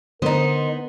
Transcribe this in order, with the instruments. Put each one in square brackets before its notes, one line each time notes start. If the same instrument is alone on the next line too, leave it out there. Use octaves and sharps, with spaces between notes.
[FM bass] D3 [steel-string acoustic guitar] B3 D#5 [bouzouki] D#4 C5 [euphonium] A#4